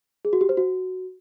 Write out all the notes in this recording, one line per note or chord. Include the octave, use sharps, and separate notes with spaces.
G#4
F#4
G4
C5
F#4